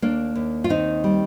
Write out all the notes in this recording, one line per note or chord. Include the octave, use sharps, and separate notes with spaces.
D#2 A#3 D4
D#2
F4
D#3 C4 D#4
G3